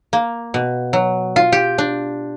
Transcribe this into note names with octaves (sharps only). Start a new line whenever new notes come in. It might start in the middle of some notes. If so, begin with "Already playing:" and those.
A#3
B2
F#3
F4
G4
D4